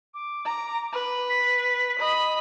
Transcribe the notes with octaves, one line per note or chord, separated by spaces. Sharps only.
D6
A#5
B4
B6
D#5 B5